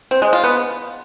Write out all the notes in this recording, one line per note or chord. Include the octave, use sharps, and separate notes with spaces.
C4
G#3
F4
B3